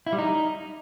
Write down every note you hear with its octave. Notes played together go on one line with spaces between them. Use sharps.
E4
G3
D#4